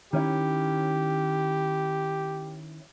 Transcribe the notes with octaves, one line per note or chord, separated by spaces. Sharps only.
D#3 C#4 E4 G4